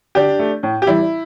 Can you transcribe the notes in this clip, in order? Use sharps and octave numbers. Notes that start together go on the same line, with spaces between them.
D3 D4 G4
A3
A2
G4
E3 G3 E4